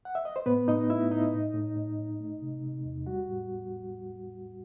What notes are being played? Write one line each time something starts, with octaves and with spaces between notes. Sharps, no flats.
F#5
E5
D#5
C5
A2 B3 B4
A2 D#4 D#5
A3 E4 E5
A2 D#4 D#5
A2
A2
A2
A2
A3
C3
C3
E2
G3 F#4 F#5
A2